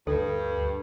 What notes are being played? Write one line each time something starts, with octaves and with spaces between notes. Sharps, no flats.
D2 G2 A4